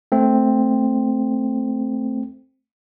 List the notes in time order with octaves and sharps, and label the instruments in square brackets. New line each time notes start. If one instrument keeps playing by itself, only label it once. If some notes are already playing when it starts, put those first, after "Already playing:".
[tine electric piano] A3 C4